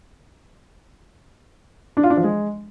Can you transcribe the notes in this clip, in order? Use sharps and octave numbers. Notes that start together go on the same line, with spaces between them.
D4
F4
D4
F3
G#3